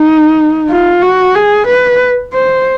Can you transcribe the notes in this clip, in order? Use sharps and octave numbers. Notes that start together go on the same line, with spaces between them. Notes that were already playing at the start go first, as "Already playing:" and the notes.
Already playing: D#4
F4
F#4
G#4
B4
C5